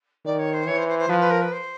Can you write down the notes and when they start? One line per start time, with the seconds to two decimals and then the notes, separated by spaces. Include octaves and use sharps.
0.25 D#3 D5
0.39 C#5
0.53 C5
0.67 E3 C#5
0.78 C5
0.88 C5
0.99 C5
1.09 F3 B4
1.20 B4
1.30 A#4
1.41 B4
1.52 C5